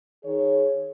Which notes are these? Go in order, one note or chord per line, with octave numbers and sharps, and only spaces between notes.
D#3 G#4 C#5